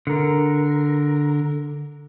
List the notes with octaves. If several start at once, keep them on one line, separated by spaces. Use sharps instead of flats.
D3 A#4